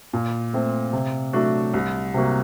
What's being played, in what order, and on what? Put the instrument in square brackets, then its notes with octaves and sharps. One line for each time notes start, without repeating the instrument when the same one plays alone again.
[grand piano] A#2
A3 C4
C3
F#3 A3 D4 F#4
C2
C3 F#3 A#3 F#4